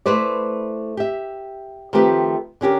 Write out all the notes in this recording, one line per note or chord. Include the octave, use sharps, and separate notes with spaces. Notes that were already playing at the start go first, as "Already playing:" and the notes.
A3 E4 B4 C5 D5
G4 E5
D#3 F3 A3 C4 G4 B4
D3 C#4 G4 A#4